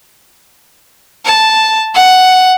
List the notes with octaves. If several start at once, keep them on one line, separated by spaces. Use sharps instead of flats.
A5
F#5